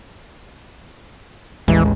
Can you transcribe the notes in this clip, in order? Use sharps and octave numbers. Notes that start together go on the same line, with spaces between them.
A1 D#2 E3 G#3